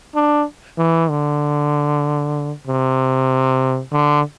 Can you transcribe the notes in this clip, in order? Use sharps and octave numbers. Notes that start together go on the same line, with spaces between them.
D4
E3
D3
C3
D3